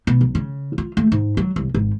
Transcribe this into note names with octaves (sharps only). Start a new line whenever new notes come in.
B2
B1
C#3
F4
A3
G#2
F#3
C2
G#1